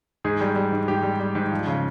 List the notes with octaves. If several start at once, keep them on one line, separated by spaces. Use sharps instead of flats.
G#2 G#4
G3
G3
G#2
G#2 G4
G3
G3
G#2
F3
C#3